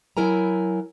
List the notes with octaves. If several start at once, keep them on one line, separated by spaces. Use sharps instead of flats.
F#3 E4 A#4 G#5 A#5